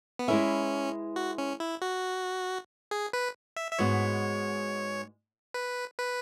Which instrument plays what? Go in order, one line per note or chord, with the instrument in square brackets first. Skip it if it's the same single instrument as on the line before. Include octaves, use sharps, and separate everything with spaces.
[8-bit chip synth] B3
[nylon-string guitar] G#3 E4 B4 E5 [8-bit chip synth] C#4
[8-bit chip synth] F#4
C#4
E4
F#4
G#4
B4
E5
E5
[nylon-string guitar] G#2 G#3 B3 F#4 [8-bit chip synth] C#5
[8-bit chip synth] B4
B4